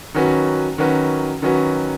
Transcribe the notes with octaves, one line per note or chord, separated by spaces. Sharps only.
D#3 F#3 C#4 F#4 B4
D#3 F#3 C#4 F#4 B4
D#3 F#3 C#4 F#4 B4